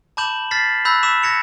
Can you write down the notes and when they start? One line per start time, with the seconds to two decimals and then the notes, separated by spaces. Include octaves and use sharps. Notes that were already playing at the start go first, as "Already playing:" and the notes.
0.17 A5 B5 D6 G6 E7 F#7
0.51 F6 A6 B6 C7
0.85 B5 E6 F#6 G6 A#6
1.03 D6 E6 B6 E7
1.23 G#6 A#6 C#7 F7